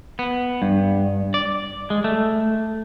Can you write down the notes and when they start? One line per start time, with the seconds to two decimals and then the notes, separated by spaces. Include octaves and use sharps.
0.19 B3
0.62 G2
1.34 D5
1.90 G#3
2.04 A3